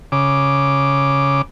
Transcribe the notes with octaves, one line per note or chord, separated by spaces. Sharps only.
C#3 D6